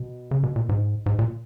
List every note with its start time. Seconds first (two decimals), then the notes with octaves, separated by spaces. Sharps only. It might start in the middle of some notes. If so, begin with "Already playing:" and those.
Already playing: B2
0.31 C#3
0.43 B2
0.56 A#2
0.69 G#2
1.06 G#2
1.19 A#2